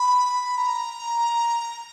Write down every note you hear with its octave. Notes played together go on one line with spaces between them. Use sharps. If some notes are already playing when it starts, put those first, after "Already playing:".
Already playing: B5
A#5